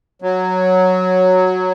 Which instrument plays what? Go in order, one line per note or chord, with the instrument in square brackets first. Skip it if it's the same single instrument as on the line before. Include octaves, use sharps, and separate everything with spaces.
[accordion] F#3